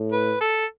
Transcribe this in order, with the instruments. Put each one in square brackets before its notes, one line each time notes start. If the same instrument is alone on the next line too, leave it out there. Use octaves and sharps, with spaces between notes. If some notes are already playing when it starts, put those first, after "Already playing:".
Already playing: [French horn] A2
[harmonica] B4
A4